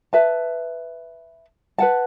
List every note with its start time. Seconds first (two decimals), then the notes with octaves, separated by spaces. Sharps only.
0.13 B4 E5 A5
1.78 B4 F#5 A5